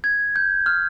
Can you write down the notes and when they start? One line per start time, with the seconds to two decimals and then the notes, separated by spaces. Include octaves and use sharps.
0.04 G#6
0.36 G6
0.66 F6